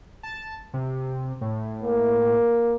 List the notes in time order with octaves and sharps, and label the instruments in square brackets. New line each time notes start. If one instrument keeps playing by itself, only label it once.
[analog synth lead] A5
C3
A2
[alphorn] A#3